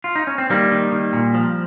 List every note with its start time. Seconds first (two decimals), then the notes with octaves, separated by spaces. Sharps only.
0.04 F4
0.15 D#4
0.27 C#4
0.38 C4
0.49 D#3 G3 A#3
0.71 D#3
0.92 D#3
1.13 A#2
1.34 F3